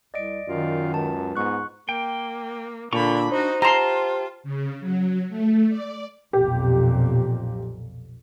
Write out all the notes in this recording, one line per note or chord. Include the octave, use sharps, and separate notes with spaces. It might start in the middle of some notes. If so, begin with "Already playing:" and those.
C2 D5 D#5 D7
F#2 D#3 F4
C#2 A5
G#2 B3 C#6 F#6
A#3 G5
A#2 D3 D4 A#5 B5 C#6
D#4 F#4 C5
F4 G4 A5 A#5 C6
C#3
F#3
A3
D5
B1 F2 A#2 G4